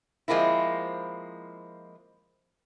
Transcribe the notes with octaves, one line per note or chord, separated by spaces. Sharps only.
F3 G#3 A#3 C4 E4